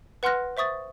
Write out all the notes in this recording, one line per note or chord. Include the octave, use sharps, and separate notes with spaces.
B4 F#5 C6 F6 F#6 A#6
C5 E5 C#6 D#6 A6